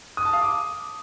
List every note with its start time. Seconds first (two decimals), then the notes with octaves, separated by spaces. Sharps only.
0.17 D#6
0.25 A5
0.33 F5
0.41 D6